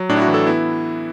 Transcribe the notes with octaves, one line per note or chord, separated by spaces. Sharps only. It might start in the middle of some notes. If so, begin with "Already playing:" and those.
Already playing: F#3
A2 D4
E4
F#4
E3
A4
B3 E4